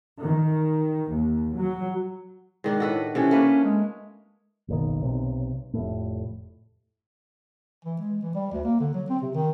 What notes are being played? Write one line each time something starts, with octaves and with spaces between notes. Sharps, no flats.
D#3
D#2
F#3
G#2 D#3 D4
A2 F#4 A4 B4
C3 E3 C#4 A4
A3 A#3 B4
G#3
F#1 B1 D#3
B1 C3
F1 A2
E3
G#3
E3
G3
D2
A#3
D3
F#3
C4
C3
D#3